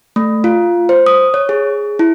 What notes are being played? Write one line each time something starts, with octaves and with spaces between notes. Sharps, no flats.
A3
F4
C5
D#6
C#5
G#4
E4